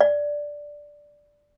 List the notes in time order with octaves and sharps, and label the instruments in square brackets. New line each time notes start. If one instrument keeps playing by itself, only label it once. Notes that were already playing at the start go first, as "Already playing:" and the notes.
[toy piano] D5